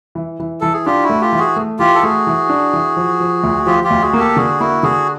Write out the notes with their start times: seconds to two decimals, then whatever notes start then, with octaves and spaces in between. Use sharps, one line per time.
0.15 E3
0.40 E3
0.61 E3 A4
0.73 G#4
0.86 D4 F4 G4
1.03 E4 F#4
1.10 A3
1.21 F4 G4
1.32 E3
1.39 F#4 G#4
1.56 A3
1.79 E3 F4 G4
1.94 A4
2.03 A3 F#4 G#4
2.27 E3
2.49 D4
2.73 E3
2.96 F3
3.20 F3
3.43 D2
3.66 F3 F4 G4
3.84 F4 G4
3.90 D2
4.02 F#4 G#4
4.13 A#3
4.19 G4 A4
4.36 D3 F#4 G#4
4.60 A#3 E4 F#4
4.83 D3 F#4 G#4